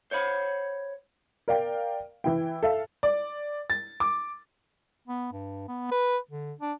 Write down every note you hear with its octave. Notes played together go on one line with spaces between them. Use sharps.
C5 C#5 F#5 B5
A#4 D5 F5 G5
E3 E4 G5
A4 E5 F5
D5
A6
D6
B3
G2
B3
B4
D3
D4